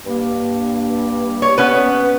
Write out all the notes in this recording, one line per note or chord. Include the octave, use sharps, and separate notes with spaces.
G2 A#3
C#5
B3 C#4 B4